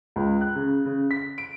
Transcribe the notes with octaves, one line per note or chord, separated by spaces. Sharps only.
C#2
F#6
C#3
C#3
B6
D7